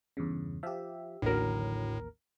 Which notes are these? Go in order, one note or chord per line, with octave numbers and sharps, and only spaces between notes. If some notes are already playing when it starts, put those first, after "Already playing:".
E2 G2 C#3
F3 G4 E5
A1 D#2 A2 D3 F#3 A#4